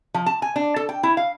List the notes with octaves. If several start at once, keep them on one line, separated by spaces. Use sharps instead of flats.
F3
A5
G#5
D4
A4
G5
E4
F5